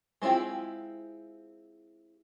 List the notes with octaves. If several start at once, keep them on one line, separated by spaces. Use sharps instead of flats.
G#3 C4 E4 F4 G4